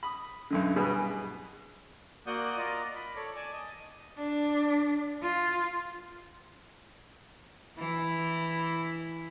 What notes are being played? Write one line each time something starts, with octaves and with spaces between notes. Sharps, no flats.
B5 D#6
B1 F#2 D3
G2 B2 G#4 B4
A#3 F#4 D5 F#5 D#6 G6
F4 A#4 D5 D#5
B5
A4 C#5 D5
D5 G#5 A5
D#5 D#6
D4
F4
E3 E4